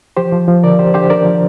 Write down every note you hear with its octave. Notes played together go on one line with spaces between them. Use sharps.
F3 G4 C5
F3
F3
D3 A#4 D5
D3 G4 C5
D3 G4 C5
D3 A#4 D5
F3